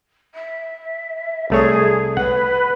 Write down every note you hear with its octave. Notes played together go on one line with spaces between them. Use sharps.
E5
C2 A3 G#4 C#5
B4 F#5